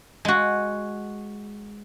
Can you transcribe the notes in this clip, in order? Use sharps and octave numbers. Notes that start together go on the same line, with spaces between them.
G#3 F#4